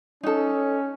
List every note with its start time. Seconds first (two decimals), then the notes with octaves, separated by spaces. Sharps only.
0.23 C#4 D#4 A4